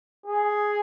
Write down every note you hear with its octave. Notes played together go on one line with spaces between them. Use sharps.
G#4